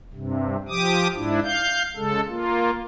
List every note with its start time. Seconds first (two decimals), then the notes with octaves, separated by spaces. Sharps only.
0.13 G2 C3
0.68 F3 G4 D6 D#6
1.15 G#2 D4 E4
1.44 F5 G6
1.97 C#3 G#3 A4
2.29 A#3 F4